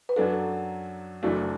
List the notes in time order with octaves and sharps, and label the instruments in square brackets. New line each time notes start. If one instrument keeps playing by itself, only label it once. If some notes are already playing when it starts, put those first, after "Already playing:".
[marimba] B4
[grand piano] F#2 F#3 D4 F#4 [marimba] A4
[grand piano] F#1 F#2 E3 A3 D4 [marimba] F#4